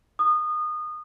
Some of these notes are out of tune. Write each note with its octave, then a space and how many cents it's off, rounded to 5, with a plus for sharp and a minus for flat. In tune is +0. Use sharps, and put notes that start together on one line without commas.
D#6 -25